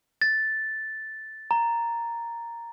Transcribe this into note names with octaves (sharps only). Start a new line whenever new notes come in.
A6
A#5